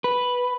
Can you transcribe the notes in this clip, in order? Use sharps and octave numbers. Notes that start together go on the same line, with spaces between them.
B4